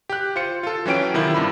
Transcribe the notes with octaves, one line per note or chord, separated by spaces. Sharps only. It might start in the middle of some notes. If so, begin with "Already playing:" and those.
G4 F#6
F4 C5 C#7
F4 A4
E3 F#3 C#4 G5 D7
C3 D#3 E4 F4
G2 C3 B5